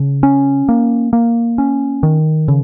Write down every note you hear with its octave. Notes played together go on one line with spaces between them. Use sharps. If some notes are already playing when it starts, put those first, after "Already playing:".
Already playing: C#3
C#4
A#3
A#3
C#4
D#3
C#3